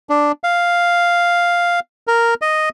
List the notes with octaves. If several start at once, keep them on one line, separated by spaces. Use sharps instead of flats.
D4
F5
A#4
D#5